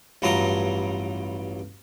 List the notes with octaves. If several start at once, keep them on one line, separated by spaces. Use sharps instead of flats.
A1 G2 F#3 F4 A#5 C6